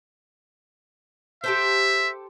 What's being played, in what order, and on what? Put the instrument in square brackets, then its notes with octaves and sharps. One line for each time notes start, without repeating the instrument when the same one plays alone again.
[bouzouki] G4 A4 C5 [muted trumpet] E5